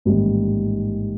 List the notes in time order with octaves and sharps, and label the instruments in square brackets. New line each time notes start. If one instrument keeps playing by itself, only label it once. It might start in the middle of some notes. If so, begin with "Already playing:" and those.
[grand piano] A1 G#2 D#3 G3 A#3